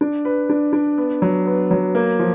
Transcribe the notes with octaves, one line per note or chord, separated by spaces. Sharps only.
D4
B4
D4
D4
B3
F#3
B3
F#3
A#3
F3